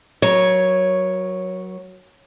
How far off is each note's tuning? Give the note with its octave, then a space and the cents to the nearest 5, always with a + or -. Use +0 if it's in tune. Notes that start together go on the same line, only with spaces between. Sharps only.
F#3 +0 A#4 +35 C#5 +0